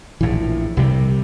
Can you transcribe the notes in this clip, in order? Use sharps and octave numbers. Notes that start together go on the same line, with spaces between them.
A#1 A2 E3
C2 C3 G3